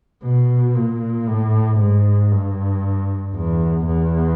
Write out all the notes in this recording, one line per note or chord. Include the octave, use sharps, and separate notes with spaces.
B2
A#2
A2
G#2
G2
E2
E2